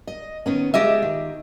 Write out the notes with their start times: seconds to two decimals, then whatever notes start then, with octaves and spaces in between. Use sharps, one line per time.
0.07 D#5
0.46 D#3 B3 C#4
0.74 G#3 F4 G4 D#5 E5
1.02 D#3